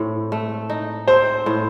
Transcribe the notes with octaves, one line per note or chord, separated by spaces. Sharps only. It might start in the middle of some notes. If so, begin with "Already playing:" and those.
Already playing: A2 C4
A3
D#4
C4 C5
A2